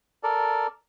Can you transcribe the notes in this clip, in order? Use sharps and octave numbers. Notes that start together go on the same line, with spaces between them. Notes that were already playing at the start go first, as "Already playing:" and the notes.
A4 A#4 D5